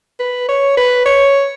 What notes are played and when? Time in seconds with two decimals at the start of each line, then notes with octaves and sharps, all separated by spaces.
0.20 B4
0.48 C#5
0.77 B4
1.06 C#5